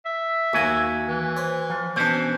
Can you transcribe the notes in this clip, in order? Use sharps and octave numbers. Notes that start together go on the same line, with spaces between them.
E5
D#2 A#3 F#4 G#5
E3
C5 C#5
F3
B2 E3 C#4 D4 C5